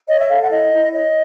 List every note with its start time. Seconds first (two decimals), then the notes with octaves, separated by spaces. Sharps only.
0.09 C#5 D#5
0.19 E5
0.29 A4 F5
0.40 F#5
0.50 E4 D#5
0.72 E4
0.92 C#5 D#5